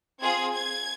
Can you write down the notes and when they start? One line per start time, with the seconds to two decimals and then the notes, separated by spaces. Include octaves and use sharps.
0.21 C4 F4 G#4 G#6
0.53 G#6